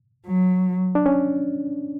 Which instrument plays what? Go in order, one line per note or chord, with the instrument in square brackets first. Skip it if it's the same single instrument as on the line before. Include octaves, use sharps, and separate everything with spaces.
[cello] F#3
[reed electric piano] D4
C#4